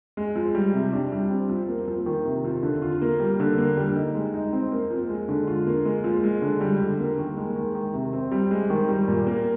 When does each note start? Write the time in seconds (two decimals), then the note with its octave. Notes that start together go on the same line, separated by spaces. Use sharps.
0.17 G#3
0.36 F3
0.55 G3
0.73 C3
0.93 D4
1.12 G3
1.30 C4
1.50 F3
1.69 A#3
1.88 F3
2.06 D#3
2.25 C3
2.45 F3
2.63 D3
2.82 F4
3.01 A#3
3.20 G3
3.40 D3
3.58 A#3
3.77 G3
3.96 D#4
4.15 G#3
4.34 D#4
4.52 C4
4.72 A#3
4.91 F3
5.09 G#3
5.29 D3
5.47 F4
5.67 A#3
5.85 G#3
6.04 F3
6.24 G#3
6.42 D3
6.61 G3
6.80 D3
6.99 A#3
7.18 D#3
7.37 G#3
7.56 D#3
7.75 D#3
7.93 C3
8.13 C4
8.31 G3
8.51 G#3
8.70 D#3
8.89 G3
9.08 A#2
9.27 A#3